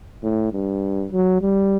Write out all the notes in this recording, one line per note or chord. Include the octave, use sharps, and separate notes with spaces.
A2
G2
F#3
G3